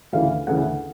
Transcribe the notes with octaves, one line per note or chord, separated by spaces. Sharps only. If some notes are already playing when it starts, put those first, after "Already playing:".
D2 C#3 E3 F5
D2 C#3 E3 F#5